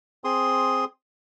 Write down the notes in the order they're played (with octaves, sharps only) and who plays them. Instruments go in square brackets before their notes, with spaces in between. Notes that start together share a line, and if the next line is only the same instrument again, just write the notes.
[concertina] C4 G#4 C6 D#6